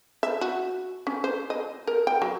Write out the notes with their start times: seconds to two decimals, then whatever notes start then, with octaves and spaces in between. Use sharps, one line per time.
0.23 E5
0.41 F#4
1.07 C#4
1.24 C5
1.50 D#5
1.87 A#4
2.07 G5
2.22 F#3